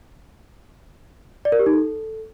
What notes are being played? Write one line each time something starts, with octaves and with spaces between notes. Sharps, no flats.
D5
A#4
G4
D#4
A4